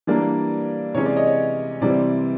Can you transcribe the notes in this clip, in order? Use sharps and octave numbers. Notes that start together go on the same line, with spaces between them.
E3 G3 A#3 D4 D5
C3 E3 G#3 C#4 C#5
D5
C#5 D#5
C#5
C3 E3 G3 C4 D5